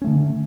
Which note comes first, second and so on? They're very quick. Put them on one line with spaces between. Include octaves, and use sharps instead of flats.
C#4 A3 D3